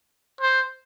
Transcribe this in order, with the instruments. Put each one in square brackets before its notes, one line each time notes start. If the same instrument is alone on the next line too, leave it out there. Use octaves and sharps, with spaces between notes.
[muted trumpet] C5